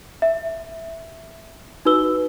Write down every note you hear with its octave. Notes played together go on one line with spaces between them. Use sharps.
E5
D#4 F#4 B4 E6 G7